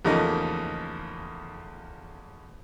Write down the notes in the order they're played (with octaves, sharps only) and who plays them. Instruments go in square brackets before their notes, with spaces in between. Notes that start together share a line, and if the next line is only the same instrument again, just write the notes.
[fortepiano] E2 C#3 F3 A3 A#3 D#4